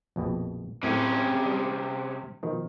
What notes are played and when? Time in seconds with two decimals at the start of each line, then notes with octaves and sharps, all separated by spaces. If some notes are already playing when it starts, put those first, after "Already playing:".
0.16 A#1 F2 B2
0.83 F#2 A2 C3 C#4
1.46 G3 G4 A5
2.43 B2 D#3 F3